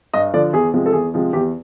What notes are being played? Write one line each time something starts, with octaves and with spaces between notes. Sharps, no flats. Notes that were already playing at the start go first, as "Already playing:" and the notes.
G2 D#5
D3 F3 D5
E2 G#4
C3 F3 G#3
A4
E2 G#4
C3 F3 G#3
E2 G4